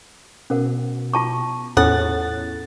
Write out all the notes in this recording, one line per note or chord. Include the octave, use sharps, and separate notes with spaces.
B2 C#4 A#4 F#5
F4 A5 C#6
E2 A2 C#4 F4 A4 C#5 F#5 A6